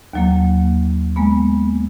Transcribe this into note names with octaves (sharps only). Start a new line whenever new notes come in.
D#2 F#3 A#3
G#3 A#3 B3